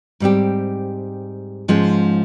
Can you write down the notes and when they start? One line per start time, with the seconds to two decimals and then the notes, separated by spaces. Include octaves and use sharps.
0.20 G#2 G3 C4 G4
1.68 G#2 F3 G#3 C#4